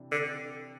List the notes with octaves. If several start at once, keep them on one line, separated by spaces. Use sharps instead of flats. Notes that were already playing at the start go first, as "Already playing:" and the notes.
Already playing: C3 E3 D4
D3